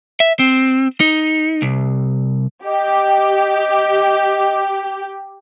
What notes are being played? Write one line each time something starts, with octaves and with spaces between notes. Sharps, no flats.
E5
C4
D#4
C2
G4 D#5